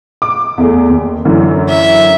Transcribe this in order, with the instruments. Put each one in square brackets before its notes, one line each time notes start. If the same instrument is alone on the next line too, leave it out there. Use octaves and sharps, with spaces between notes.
[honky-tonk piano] D6
E2 A3 G#4
D#2
F#2 D3 E3
[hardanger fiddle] E5